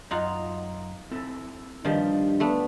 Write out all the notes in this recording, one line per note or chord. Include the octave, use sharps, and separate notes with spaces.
F#2 D#4 F4 F#5 A#5
C4 E4 A4
G2 D#3 F3 G4 D5
A3 B3 D4